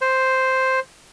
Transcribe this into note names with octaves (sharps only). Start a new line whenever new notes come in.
C5